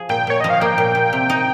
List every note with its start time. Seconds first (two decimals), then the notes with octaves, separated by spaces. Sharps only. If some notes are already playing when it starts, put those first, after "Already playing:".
Already playing: F3 G#4
0.09 A#2 G5
0.27 A#2 C#5
0.40 F3 D#5
0.50 F5
0.60 A#3 G5
0.78 A#2
0.95 A#2
1.13 C3
1.30 D#4